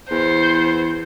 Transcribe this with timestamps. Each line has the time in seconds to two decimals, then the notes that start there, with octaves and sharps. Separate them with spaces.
0.11 E2 C5